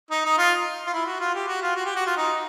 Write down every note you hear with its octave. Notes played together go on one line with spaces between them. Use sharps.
D#4
D#4
F4
F4
E4
F#4
F4
G4
F#4
F4
F#4
G4
F#4
F4
D#4